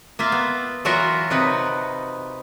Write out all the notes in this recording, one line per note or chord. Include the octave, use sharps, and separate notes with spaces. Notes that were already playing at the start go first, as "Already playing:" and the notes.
A#3 F4 E5 F5
B3
E3 F#3 F4 F#4 A#4 E5
C3 D#4 B4